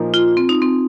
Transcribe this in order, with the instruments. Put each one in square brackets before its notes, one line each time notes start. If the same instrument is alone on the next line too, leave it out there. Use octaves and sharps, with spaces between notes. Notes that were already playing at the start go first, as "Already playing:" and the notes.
Already playing: [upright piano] A#2 F3 A#3 D#4
[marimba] F4
C4
D#4
C4